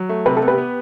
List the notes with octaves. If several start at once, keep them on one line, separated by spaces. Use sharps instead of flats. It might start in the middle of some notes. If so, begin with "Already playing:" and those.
Already playing: F#3
A3
C3 B4
A4
B3
G4 B4
B3